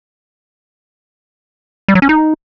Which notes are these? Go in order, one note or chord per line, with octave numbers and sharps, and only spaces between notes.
G3
F#3
C#4
D#4